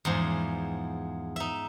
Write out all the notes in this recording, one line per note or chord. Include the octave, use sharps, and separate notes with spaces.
E2 G#2 F3
D#4 E5